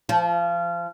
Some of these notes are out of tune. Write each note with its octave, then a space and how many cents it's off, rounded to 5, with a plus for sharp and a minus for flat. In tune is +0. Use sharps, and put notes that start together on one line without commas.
F3 -25